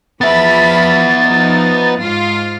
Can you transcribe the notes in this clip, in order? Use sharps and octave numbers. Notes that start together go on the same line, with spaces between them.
F3 B3 E5 B5 A6
F3 D#4
G#2 F4